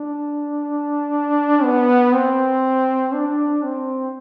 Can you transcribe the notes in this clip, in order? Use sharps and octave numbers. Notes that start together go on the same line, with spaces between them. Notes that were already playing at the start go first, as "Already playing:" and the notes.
Already playing: D4
B3
C4
D4
C4